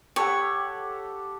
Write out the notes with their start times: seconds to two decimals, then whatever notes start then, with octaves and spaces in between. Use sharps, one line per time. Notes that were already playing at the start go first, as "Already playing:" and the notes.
0.16 G4 A4 C#5 F#5